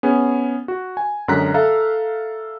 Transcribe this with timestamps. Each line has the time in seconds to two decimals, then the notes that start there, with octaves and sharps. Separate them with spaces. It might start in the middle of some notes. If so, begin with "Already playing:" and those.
0.03 B3 C#4 G#4
0.68 F#4
0.97 G#5
1.28 F#2 D3 G#3 A#5 F#6 B6
1.54 A4 E5 F5 A#5